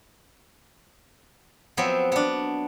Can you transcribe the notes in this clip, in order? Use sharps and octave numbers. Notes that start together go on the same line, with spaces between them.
F3 F#3 B3 C4 E5
B3 D4